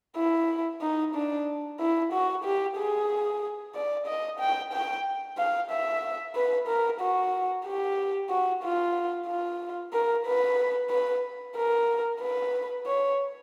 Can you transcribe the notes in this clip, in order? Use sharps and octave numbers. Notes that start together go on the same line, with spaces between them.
E4
D#4
D4
E4
F#4
G4
G#4
D5
D#5
G5
G5
F5
E5
B4
A#4
F#4
G4
F#4
F4
F4
A#4
B4
B4
A#4
B4
C#5